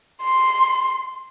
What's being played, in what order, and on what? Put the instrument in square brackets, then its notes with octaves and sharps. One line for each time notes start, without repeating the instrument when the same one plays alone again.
[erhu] C6